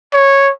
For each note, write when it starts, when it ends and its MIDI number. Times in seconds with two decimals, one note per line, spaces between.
0.13 0.50 73